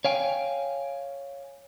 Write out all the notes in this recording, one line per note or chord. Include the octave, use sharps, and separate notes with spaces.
C#5 F5 G5 G#5